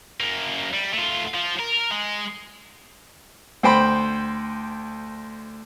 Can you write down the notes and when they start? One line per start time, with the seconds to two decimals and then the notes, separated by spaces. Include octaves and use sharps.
0.21 F#2 A#3
0.73 G3
0.94 A3 F4
1.34 F3
1.60 A#4
1.91 G#3
3.63 D2 C5 G5 B5